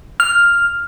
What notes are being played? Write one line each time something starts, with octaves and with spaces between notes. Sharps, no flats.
F6